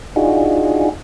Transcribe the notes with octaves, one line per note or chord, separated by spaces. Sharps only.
D4 D#4 F4 F#4 G#4